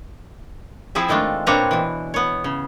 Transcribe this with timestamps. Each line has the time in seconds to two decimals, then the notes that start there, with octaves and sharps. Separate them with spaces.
0.95 F3 C4 E4 G#4 E5
1.08 D#3 G#3 A3 D4 F4
1.47 A#2 C4 D4 B4 C#5 A#5
1.71 B2 E3
2.14 B3 C#5
2.44 C#3